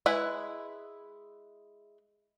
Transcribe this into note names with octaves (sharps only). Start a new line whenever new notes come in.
G#3 E4 B4